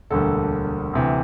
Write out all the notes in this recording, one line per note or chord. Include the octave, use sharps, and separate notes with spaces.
E1 D2 D3 G3 A#3 A4
D2 C3 E3